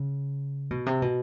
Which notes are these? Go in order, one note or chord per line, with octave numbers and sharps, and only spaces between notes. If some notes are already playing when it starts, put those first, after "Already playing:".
Already playing: C#3
B2
C3
B2